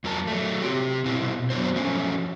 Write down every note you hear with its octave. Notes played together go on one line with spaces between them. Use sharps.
F2 F#3 A#4 A5
F#3 A3
C3 C4 G4
B2 C4 E4
F#3 B3 D4 F#4 C5
F3 F#3 A3 C#4